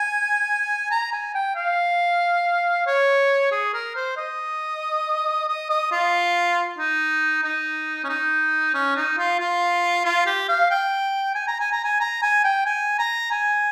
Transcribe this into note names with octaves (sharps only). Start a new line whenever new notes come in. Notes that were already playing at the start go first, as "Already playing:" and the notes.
Already playing: G#5
A#5
G#5
G5
F5
C#5
G#4
A#4
C5
D#5
D#5
D#5
F4
D#4
D#4
C#4
D#4
C#4
D#4
F4
F4
F4
G4
F5
G5
G#5
A#5
G#5
A#5
G#5
A#5
G#5
G5
G#5
A#5
G#5